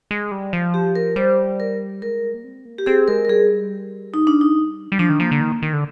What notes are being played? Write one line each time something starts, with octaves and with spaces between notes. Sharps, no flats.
G#3
G3
F3
G4
A#4
G3 C5
A#4
G#3 A#4
A#3
C4
A#3
G4
C4 G#4
G#3 A#4
A#4
G3 G#4
D#4
D4
D#4
G3
F3 D4
D#3
F3 A#3
D3
D#3
D#3
D3